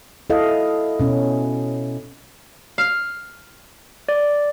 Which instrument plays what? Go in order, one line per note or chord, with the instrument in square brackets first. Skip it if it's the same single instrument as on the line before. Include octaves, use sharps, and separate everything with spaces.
[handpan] E4 A4 D#5 F5
B2 C#4
[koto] F5
[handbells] D5